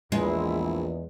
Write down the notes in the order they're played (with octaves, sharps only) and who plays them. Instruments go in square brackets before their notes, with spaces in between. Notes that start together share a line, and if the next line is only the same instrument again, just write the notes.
[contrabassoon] A#1 [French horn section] E2 [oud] G#3 [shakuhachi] E4